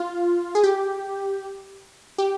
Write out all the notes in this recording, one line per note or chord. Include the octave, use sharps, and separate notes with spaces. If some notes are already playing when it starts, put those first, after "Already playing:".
Already playing: F4
G#4
G4
G4